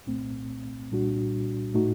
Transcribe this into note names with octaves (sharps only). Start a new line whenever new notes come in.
C2 A#2 A3 C4
C2 A#2 G3 D4 F#4
A2 A3 D#4 F#4